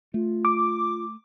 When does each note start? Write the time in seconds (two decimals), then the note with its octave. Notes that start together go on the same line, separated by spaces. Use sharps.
0.14 A3 F4
0.45 D6